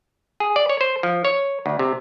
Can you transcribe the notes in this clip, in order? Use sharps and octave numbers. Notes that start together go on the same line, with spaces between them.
G#4
D5
C#5
C5
F3
C#5
D2
C3